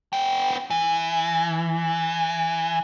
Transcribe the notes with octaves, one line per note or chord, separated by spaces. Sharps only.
B3 G5
E3